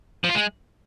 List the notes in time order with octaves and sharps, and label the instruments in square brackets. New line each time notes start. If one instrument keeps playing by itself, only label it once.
[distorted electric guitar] F3
F4
G#3